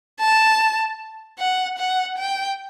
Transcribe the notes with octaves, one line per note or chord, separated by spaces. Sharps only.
A5
F#5
F#5
G5